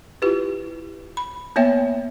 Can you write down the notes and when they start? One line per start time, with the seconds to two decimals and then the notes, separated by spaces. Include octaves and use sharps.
0.22 E4 F4 G4 B4
1.17 B5
1.56 A#3 B3 C#5 E5 G5